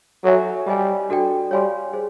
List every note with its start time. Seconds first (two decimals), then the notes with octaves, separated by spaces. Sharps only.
0.24 F#3 A4 C#5 E5 G#5
0.67 G3 G4 C5 D#5 G#5
1.09 D4 F#4 A4 D5 G5
1.51 G3 C#5 F5 G#5 C6
1.93 G#4 C5